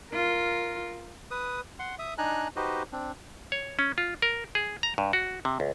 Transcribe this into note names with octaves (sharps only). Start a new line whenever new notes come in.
F4 A#4
B4 D#6
F#5 C6
E5 D#6
D4 D#4 G#5 A#5 F#6
D#4 F#4 G4 B4 C5 D#5
C4 D4
C#5
C#4
F4
A#4
G#4
A#5
G2
F#4
C3
C#2